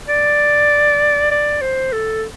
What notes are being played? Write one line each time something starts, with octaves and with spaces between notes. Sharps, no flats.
D5
D5
C5
A4